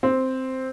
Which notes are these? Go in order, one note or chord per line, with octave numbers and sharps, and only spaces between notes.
C4